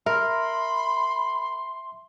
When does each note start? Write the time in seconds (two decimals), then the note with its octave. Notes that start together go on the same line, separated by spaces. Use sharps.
0.06 A#4 E5 B5 C6